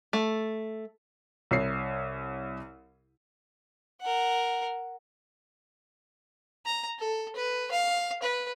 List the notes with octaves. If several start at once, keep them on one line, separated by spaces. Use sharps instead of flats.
A3
C2 C#5 C7
A#4 F#5
A#5
A4
B4
F5
B4